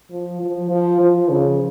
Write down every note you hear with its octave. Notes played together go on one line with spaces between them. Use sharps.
F3
F3
F3
F3
C#3